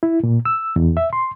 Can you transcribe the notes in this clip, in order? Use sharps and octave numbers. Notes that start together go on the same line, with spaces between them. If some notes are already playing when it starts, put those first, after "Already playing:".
E4
A#2
E6
E2
E5
C6